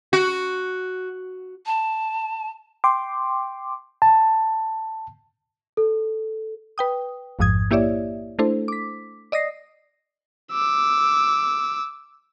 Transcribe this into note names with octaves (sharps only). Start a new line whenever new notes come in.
F#4
A5
G5 C6 D6
A5
A4
B4 G5 D#6
A1 F2 G#2 F3 D#6 G#6
A#3 E4 G4 C#5 D5 E5
A3 D4 E4 A4 C5
D6 B6
D5 D#5 D#6 A#6 C7
D6 E6